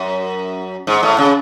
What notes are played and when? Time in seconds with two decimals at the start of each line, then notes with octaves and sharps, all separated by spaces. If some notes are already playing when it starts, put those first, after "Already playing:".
Already playing: F#2
0.87 G#2
1.03 A2
1.18 C#3